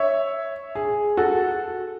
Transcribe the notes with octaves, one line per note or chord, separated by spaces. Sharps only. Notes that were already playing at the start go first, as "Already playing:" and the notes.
Already playing: C#5 E5
G#4
F#4 A4